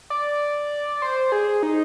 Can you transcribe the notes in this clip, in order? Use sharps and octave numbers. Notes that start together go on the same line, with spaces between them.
D5
C5
G#4
D#4